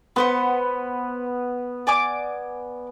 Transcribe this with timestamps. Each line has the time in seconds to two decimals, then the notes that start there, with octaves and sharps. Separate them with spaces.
0.16 B3 B4 C5 F#5
1.87 D5 G#5 D6